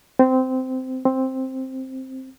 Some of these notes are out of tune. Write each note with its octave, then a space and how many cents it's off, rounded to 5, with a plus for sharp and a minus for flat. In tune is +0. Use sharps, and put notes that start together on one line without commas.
C4 -15
C4 +5